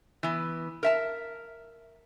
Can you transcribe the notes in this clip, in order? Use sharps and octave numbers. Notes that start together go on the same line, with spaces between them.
E3 B3
A#4 E5 A5